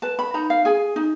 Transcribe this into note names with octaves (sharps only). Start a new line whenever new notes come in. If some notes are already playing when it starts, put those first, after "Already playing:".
B4 A5
B5
D#4 A#5
F5
G#4 G#5
D#4